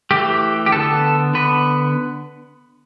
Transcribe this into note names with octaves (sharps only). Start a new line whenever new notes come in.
E3 A3 G4
G4
D3 B3 A4
D3 B3 B4